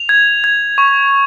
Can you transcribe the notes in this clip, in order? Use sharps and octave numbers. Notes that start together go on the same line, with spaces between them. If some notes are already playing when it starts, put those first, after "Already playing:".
Already playing: F7
G#6
G#6
C#6